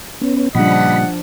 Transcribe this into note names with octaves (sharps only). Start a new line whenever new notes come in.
B3 C#4
A#2 C#3 F3 G3 D4 D#5 F#5 B5